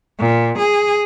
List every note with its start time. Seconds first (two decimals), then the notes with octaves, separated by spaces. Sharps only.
0.20 A#2
0.59 G#4